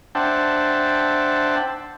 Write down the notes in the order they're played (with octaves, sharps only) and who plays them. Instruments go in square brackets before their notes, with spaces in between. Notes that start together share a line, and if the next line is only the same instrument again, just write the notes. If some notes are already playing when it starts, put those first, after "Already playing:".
[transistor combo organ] D4 C5 E5 F#5 G5 A5